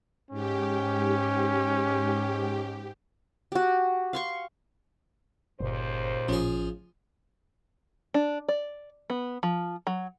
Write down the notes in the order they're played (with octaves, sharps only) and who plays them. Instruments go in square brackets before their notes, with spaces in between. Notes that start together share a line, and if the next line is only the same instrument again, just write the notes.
[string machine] G#2 G4 [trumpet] C#4
[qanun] F#4 G4
F5 C6 C#6
[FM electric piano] G1 [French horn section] D#2 C#3 C5 [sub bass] A#2
[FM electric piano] A1 C#4 [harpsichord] F3 G#4
[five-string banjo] D4
D5
B3
F3
F#3